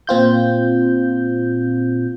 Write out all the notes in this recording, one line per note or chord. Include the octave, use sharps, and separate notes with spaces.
A#2 C4 F4 G6